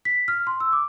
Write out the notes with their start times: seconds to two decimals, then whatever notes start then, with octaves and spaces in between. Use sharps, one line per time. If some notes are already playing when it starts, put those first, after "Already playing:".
0.05 B6
0.28 F6
0.47 C6
0.60 E6
0.73 D6